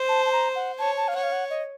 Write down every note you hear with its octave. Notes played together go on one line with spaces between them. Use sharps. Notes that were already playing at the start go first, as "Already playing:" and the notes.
Already playing: C5
A5
A5
A#5
F#5
C#5 A5
A5
F5
C#5 F#5
F5
F#5
D#5